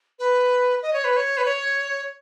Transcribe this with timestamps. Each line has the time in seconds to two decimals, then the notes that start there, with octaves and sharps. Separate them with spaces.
0.19 B4
0.82 D#5
0.93 C#5
1.04 B4
1.16 C#5
1.37 B4
1.45 C#5